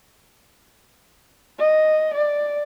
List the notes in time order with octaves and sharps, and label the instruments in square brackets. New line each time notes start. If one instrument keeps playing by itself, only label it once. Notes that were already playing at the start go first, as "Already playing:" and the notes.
[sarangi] D#5
D5